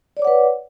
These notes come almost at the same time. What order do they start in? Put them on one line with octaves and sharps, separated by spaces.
D5 C#5 D6 F#5 B4